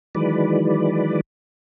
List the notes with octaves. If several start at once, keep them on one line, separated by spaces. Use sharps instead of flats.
D#3 E3 F#3 G#3 B4 D5